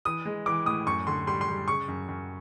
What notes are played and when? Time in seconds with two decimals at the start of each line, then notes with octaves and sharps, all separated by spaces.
0.05 E3 D#6
0.25 G#3
0.46 E3 D6
0.66 A2 D#6
0.86 F#2 C#6
1.07 D3 C6
1.27 G3 C6
1.41 C6
1.48 G3
1.68 C#3 C#6
1.88 F#2
2.09 F#2